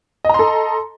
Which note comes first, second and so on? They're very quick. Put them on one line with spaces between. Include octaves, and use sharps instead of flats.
D#5 A#5 C6 A4